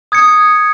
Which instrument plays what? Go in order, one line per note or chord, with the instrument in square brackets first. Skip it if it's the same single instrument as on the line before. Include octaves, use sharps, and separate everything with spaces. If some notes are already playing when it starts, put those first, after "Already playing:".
[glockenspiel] D#6 G#6 C#7